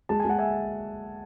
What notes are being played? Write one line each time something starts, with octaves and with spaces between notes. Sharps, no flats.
G#3 A5
G#5
G#3 F#5
E5 G#5